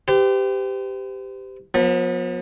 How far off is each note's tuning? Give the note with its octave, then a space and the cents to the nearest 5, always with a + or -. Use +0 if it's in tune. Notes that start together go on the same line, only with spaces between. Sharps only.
G4 +0 C5 -45
F3 +45 B3 -20